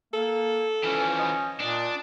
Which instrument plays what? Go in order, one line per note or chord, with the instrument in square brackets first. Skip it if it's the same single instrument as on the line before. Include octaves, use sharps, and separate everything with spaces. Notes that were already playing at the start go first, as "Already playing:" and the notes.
[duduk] A#3 [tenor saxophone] A4
[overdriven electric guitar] E3 F3 [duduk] C#4
[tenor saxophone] D#5
[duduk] A#2 [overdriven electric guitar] D4